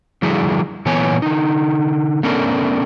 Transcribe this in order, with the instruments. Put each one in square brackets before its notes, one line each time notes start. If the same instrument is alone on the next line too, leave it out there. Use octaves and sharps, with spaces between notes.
[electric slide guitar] D3 F3 G3 E4 F#4 G#4
A#2 E3 B3 C#5 G#5
D3 D#4
A3 B3 C#4 D4 A#4